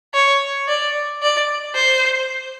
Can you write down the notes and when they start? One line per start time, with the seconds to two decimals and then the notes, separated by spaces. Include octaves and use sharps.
0.14 C#5
0.68 D5
1.22 D5
1.75 C5